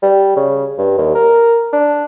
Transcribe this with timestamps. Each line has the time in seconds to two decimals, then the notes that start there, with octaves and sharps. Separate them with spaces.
0.03 G3
0.36 C#3
0.78 G2
0.98 D#2
1.15 A#4
1.73 D4